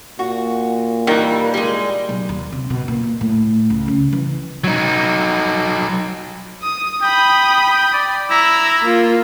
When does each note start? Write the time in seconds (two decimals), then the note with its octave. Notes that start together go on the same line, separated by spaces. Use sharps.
0.19 A#2 F#4
1.07 D#3 E3 G3
1.54 G3 G#3
2.09 B1
2.29 D#2
2.52 C3
2.70 B2
2.88 A#2
3.21 A2
3.70 C#2
3.88 C#3
4.13 E3
4.64 F#3 D#4
6.62 D#6
7.02 G5 B5 D#6
7.93 D5
8.30 E4 A#5 E6
8.82 A#3 F4